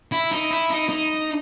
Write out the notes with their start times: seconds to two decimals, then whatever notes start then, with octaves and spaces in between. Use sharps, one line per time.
0.12 E4
0.31 D#4
0.51 E4
0.70 D#4
0.89 D#4